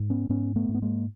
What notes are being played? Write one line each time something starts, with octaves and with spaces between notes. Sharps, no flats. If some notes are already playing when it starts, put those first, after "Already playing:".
Already playing: G#2
B3 C#4
G#2 B3 C#4
A3 B3
G#2
B3
G#3 A#3